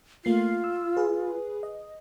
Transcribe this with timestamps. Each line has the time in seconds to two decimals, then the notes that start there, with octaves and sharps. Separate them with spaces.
0.25 A3 A#3 F4 C7
0.64 E6
0.97 G#4 B4
1.63 D#5